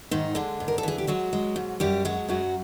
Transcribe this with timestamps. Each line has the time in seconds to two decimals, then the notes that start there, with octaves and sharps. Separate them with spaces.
0.11 G#2 D#3 D#4
0.35 D3 G#3 D4
0.60 G#2
0.68 A#4
0.78 A4
0.83 E3 G#4
0.98 G4
1.07 F#3 G#3 F#4
1.33 G#3
1.56 G#2
1.80 F#2 G3 G4
2.05 F#3 G#3 F#4
2.28 F#2 F#3 F#4